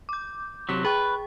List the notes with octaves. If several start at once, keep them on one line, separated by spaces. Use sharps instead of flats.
D6 G6
C3 F#3 B6
G#4 B4 G5 C#6